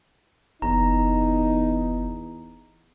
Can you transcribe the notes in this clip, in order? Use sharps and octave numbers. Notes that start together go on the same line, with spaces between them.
F#1 E2 D#4 A#5